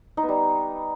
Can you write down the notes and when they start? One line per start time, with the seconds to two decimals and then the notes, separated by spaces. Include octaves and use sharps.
0.17 D#4
0.23 B3
0.29 G3